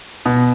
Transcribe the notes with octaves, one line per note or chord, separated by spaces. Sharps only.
B2